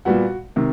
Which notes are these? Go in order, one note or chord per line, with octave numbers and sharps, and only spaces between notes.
A#2 G3 B3 F#4 F#5
C3 D#3